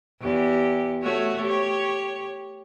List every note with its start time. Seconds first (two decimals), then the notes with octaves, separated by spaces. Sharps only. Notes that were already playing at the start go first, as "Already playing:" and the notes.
0.21 E2 G4
1.02 A3 F#4 C#5
1.42 G4 C#5